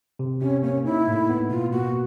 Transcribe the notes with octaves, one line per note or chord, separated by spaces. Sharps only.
C3
C3 C#4
A#3 C#4
D#4 E4
A2
B3
B2 F4
A#3 F#4